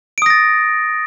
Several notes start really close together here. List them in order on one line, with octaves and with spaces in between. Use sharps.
D7 D#6 A#6 A6